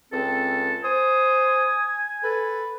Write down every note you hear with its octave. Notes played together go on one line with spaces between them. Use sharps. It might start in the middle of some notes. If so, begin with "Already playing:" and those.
C#2 C4 A4
C5 G#5 D#6
A4 B4